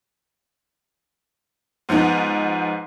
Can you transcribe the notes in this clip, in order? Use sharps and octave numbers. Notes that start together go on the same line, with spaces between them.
G#2 F3 B3 D#4